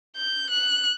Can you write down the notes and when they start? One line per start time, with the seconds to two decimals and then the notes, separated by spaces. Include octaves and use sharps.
0.16 G6
0.50 F#6